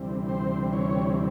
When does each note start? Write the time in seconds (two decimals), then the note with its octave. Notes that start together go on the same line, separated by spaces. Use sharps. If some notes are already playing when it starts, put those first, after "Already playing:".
Already playing: D2 C3 E3 G3 C4
0.29 C5
0.73 C#5